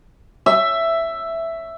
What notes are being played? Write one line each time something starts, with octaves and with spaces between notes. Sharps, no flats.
E5